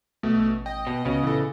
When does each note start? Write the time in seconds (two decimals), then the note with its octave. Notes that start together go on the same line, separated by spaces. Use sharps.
0.23 B1 B2 A3
0.38 A1
0.66 D#5 G5
0.87 B2
1.05 C#2 C#3 B3 C#4 F#4
1.23 A#2 E3 A4